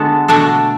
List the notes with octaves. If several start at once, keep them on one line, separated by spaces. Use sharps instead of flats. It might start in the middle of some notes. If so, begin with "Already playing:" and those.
Already playing: D3 G#3 B3 F#4 A4
B2 A3 D4 F#4 A4